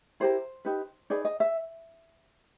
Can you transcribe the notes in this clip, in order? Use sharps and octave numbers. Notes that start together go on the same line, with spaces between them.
E4 G4 A#4 C5
D#4 G4 B4
D#4 G#4 B4 D5
D#5
E5